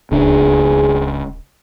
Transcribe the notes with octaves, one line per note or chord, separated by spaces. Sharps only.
D1 C#2 D4 G#4